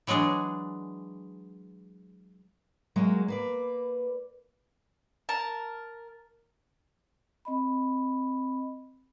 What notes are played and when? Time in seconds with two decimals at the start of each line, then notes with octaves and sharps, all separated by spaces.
0.07 E3 F#3 G#3 D4 G#4
2.96 F#3 G#3 A#3 F#4
3.28 A#3 B4 D5
5.29 A#4 A5
7.45 C4 D#5 B5